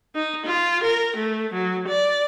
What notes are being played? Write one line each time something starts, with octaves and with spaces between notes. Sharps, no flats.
D#4
F4
A#4
A3
F#3
D5